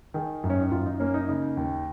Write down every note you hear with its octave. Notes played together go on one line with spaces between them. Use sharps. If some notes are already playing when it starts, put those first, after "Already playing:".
D#3 G#4
F#2
C#4
D#4
F#2 F4
D#4
A#3 C#4
D#4
C#3 D#4
D#2